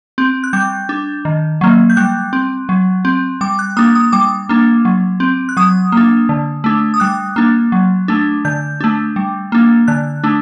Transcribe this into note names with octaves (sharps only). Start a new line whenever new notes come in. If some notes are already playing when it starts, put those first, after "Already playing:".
C4
F#6
G3 G6
D4
D#3
F#3 A#3
G6
G3 F#6
C4
F#3
C4
G3 D6
F#6
A#3 D4 D#6
D#6
G3 D6
A#3 D4
F#3
C4
F#6
F#3 D#6
A#3 D4
D3
A3 D4
D#6
G3 F#6
A#3 D4
F#3
A3 D4
D3 G6
A3 D4
G3
A#3 D4
D3 F#6
A3 D4